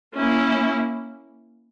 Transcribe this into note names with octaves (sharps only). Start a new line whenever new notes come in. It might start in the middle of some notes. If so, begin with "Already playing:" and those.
A#3 C#4 E4